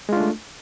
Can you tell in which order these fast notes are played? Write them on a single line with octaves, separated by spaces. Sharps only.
G#3 F4 D4 A3